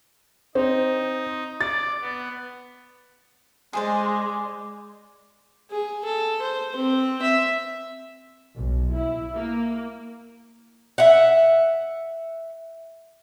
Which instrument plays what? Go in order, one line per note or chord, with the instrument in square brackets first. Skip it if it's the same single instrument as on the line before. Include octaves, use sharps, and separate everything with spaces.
[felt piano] C4 [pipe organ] D#4
[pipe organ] D5 [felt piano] A6
[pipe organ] B3
[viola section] G#3 [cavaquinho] G#4 C5 D5
[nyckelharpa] G#4
A4
C5
C4
E5
[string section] B1
E4
A#3
[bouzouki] E5 F#5